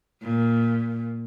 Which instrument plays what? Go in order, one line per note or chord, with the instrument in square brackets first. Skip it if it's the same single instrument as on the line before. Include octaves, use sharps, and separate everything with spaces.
[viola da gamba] A#2